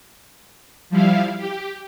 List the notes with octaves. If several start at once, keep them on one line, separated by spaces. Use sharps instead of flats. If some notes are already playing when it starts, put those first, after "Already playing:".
F3 G3 E4 F5
G4